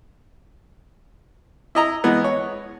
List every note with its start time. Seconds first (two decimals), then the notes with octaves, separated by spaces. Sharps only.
1.75 E4 D#5 A#5
2.04 E3 G#3 B3
2.24 C#5